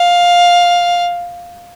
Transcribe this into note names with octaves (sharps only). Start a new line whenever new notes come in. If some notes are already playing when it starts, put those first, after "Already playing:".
Already playing: F5